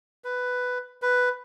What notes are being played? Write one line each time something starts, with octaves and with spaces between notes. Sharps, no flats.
B4
B4